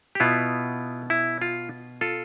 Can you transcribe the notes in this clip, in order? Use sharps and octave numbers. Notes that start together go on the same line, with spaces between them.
G4
B2 B3 E4 F4
E4
F4
F4 A4